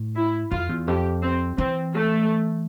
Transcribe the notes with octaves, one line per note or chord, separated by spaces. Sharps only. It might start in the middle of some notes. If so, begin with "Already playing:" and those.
Already playing: A2
E4
F2 F4
E2
F2 G4
C4
E3 C4
A3